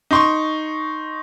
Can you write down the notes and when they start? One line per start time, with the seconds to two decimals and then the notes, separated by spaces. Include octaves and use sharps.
0.11 D#4 C6 C#6